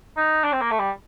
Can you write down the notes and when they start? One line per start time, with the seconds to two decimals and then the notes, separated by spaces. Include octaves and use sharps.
0.17 D#4
0.44 D4
0.52 C4
0.61 A#3
0.71 A3
0.79 G3